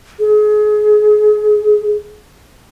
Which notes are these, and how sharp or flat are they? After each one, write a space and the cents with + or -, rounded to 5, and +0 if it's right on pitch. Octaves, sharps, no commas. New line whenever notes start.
G#4 +30